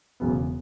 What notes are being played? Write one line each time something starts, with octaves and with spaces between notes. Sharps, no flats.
E1 E2 C#3 F#3 B3